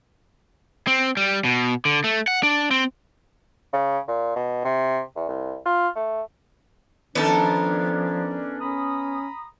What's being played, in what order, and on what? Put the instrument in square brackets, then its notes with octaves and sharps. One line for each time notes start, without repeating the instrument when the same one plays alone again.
[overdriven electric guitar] C4
G3
B2
D3
A3
F#5
D4
C4
[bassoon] C#3
A#2
B2
C3
E2
C2
F4
A3
[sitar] D#3 A4 A#4 [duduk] F3 [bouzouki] B3 A5 [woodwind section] C#4 D4
[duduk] C#4 [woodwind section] A#5 B5 D#6